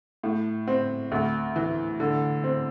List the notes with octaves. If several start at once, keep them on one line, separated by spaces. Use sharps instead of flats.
A2
C4
D2
E3
D3
C4